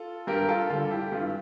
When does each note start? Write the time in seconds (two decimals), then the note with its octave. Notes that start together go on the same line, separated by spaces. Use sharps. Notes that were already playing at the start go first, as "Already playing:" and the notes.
Already playing: F4 A4
0.27 G2 G4 A#4
0.49 F4 A4
0.70 D3 G3 F4 A4
0.91 E4 G4
1.12 G2 F4